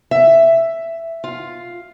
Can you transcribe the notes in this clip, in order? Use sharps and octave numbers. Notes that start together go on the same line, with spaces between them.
E5
F4